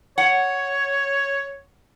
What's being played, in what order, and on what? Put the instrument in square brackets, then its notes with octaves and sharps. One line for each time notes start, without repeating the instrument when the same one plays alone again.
[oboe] C#5 [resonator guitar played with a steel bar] F#5